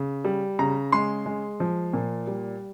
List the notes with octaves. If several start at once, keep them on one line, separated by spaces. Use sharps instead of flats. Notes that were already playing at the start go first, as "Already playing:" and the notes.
Already playing: C#3
G3
C#3 A#5
G#3 C6
G#3
F3
A#2
G3